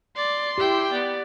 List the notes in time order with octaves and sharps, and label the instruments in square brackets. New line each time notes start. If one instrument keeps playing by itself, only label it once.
[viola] D5 [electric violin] C6
[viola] E4 G5 [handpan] G4
[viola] B3 [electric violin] D5